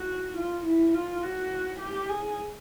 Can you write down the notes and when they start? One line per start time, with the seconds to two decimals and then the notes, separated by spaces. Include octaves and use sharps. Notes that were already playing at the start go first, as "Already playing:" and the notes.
Already playing: F#4
0.37 F4
0.65 E4
0.94 F4
1.23 F#4
1.80 G4
2.09 G#4